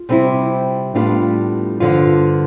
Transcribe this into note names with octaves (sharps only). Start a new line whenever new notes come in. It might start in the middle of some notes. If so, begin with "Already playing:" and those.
Already playing: F4
C3 G3 C4 E4
A2 G3 B3 D4 F4
G2 D3 F3 F4